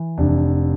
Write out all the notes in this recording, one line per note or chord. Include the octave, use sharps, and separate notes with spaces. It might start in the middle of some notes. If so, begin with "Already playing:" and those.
Already playing: E3
F1 D4